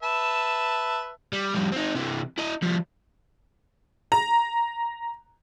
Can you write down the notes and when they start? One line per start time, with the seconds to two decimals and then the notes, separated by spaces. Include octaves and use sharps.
0.03 B4 E5 A5
1.33 G3
1.54 F2 G3
1.72 C4 D#4
1.95 C3 E3
2.38 E4 D#5
2.62 F3 G3
4.12 A#5